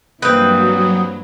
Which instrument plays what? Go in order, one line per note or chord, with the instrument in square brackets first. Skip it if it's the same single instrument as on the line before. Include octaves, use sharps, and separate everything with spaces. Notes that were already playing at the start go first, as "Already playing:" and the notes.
[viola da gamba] G2 E3 A#3 [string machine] F#3 [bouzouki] C4 B4 [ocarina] D#6